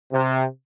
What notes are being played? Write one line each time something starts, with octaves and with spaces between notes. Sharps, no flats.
C3